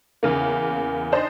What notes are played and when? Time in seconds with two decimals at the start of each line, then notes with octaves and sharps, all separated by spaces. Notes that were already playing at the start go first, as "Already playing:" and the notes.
0.23 E2 C#3 A#3
1.12 D4 D#4 C5 D#5